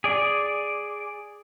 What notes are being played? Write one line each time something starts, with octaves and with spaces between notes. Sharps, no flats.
G#4 D5